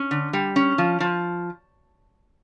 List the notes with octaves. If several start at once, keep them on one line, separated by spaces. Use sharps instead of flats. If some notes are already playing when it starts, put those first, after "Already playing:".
Already playing: C#4
D3
G3
C#4
F3
F3